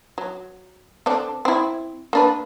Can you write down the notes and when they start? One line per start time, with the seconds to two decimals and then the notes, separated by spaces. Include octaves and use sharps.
0.18 F#3
1.06 D3 C4 D4
1.45 C4 E4
2.13 A#3 D4 B4